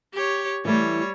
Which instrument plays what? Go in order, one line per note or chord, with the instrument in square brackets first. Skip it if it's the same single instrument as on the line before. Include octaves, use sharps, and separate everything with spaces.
[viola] G4 C#5
[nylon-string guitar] E3 A3 [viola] G3 C#5